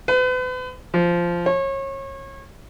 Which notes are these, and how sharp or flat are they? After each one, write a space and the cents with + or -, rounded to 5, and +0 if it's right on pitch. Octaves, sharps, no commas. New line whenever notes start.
B4 +40
F3 -10
C#5 -30